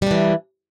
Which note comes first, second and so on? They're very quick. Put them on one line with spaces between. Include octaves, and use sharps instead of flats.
G3 D4 E3